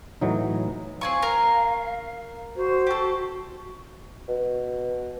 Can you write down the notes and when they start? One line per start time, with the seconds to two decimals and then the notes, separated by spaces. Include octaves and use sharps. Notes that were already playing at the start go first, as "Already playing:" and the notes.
0.21 A2 E3 F#3 D#4
1.01 C4 F5 G#5 C#6
1.22 A#4
2.56 F#4 C5
2.87 G4 A4
4.28 B2